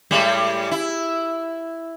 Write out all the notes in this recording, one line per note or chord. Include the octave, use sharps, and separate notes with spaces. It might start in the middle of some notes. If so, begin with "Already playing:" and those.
A2 G3 G#3
E4